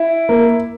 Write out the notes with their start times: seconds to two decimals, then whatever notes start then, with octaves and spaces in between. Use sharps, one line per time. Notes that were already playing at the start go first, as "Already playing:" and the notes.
Already playing: E4
0.29 A#3